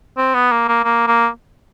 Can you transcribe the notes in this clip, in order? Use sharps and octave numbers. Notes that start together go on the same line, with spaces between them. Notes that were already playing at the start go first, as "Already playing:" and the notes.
C4
B3
A#3
A#3
A#3
A#3